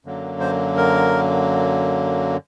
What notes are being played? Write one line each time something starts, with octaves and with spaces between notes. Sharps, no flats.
F#2 D3 F#3 A#3
C5
A#4